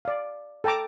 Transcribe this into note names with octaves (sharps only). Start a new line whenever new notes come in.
D5 F5
A4 G5 A5 A#5 D6